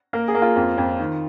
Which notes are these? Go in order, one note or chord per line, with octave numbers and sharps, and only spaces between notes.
A#3 A#4
G#4
A#3
F4
F2
F2
D#3